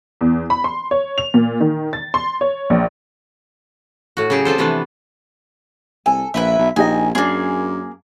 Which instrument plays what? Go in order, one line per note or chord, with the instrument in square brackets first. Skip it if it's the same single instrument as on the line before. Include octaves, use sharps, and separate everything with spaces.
[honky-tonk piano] E2
B5
C6
C#5
F7
A#2
D#3
A6
C6
C#5
A#1
[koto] A2 F#4
C#3 F#3 G4 G#4
C4 F4 A4 C5
C3 E3 F3 A3 B3 D4
[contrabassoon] C2 [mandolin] A4 [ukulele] G#5
[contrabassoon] A#1 [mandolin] E4 B4 E5
[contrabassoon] B1
[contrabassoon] A#1 [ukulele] D#4 G4 D#5 [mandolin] G#5
[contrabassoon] F#2 [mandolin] A#3 G#4 [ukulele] C#4 D4